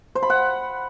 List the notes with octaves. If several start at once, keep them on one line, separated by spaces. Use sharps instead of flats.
C5
B5
F#5